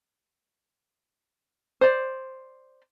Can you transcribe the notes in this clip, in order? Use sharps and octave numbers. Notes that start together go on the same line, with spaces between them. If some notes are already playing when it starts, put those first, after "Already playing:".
C5 D5